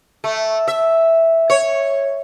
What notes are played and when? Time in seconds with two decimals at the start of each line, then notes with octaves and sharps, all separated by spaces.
0.24 A3
0.68 E5
1.50 C#5